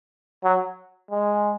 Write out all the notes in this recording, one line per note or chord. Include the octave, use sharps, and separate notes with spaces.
F#3
G#3